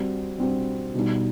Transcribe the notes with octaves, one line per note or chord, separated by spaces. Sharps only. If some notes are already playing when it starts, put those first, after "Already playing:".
Already playing: G3 C4 F#4
G3 C4 F#4
B2 G3 D#4